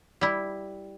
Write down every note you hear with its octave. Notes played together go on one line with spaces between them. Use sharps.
G3 E4